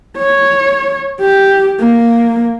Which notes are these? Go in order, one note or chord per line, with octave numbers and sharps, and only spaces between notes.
C#5
G4
A#3